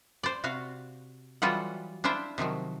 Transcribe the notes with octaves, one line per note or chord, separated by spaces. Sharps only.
C5 D5
C3 F#4 F5
E3 F#3 G3 F4 A4 F#5
D4 E4 F4 C5 E5 G5
C3 D#3 F3 F#3